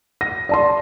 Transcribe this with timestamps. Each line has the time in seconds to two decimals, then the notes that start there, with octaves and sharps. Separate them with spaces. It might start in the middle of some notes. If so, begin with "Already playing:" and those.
0.21 A#6
0.49 D5 A5 C6